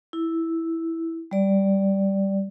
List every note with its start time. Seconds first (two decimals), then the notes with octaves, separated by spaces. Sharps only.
0.13 E4
1.31 G3 D5